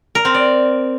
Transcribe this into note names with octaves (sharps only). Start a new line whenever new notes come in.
A#4
C4
D5